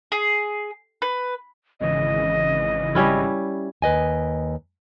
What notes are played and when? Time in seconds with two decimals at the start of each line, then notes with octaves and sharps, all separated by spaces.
0.12 G#4
1.02 B4
1.80 G#1 C#3 E3 D#5
2.95 G3 C#4 E4
3.82 D#2 B4 D#5 G#5